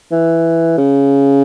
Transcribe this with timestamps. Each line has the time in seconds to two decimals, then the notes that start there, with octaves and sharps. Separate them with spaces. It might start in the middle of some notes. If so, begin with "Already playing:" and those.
0.12 E3
0.78 C#3